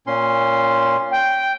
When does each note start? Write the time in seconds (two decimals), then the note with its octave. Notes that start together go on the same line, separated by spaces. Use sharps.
0.07 A#2 C#4 C6
1.11 G5